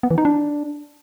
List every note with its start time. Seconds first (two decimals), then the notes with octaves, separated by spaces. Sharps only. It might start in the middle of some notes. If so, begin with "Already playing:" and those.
0.03 B3
0.11 E3
0.18 D#4
0.25 D4